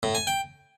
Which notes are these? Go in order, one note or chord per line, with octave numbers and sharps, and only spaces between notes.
A2
G#5
G5